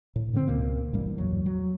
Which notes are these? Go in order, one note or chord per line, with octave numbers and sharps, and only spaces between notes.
A2
G#2 D3 A#3 C4
C#2 B2 A#3
A1 G2 G3 A#3
E2 F#3
F#3